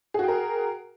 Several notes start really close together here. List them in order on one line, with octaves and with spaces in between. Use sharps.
G#4 F#4 G5 A#4